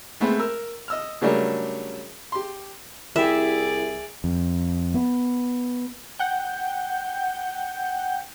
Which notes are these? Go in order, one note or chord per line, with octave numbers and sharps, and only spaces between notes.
G#3 A3 B3 C4
A#4 E6
D#5 E6 F6
C#3 F#3 G3 A3 D4 A#4
G4 C6
C2 E4 G4 G#4 D5 E5
F2
B3
F#5 G5 G6